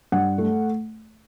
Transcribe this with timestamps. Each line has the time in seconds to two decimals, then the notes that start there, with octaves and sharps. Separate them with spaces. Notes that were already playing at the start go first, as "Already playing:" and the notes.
0.12 G2 F#5
0.38 A3